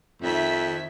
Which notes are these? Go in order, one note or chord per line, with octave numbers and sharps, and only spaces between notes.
F2 D#3 E5 B6